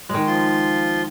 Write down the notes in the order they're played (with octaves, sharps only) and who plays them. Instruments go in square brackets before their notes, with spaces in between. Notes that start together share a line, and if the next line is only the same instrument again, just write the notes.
[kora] D#3 G#3
[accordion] F3 F4 C6